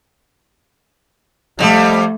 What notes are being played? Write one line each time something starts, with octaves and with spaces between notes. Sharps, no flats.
F2 G3 A3